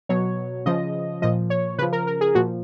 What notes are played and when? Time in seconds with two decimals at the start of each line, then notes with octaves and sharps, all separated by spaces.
0.09 B2 F#3 C#5
0.66 C#3 F3 D#5
1.22 A#2 F3 D#5
1.50 C#5
1.78 C#3 F3 B4
1.93 A#4
2.07 A#4
2.21 G#4
2.35 A#2 F3 F#4